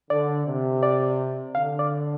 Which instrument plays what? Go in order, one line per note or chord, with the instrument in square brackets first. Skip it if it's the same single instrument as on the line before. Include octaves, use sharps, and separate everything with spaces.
[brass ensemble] D3 [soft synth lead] D5
[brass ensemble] C3
[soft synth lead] D5
[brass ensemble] D3 [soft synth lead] F5
[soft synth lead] D5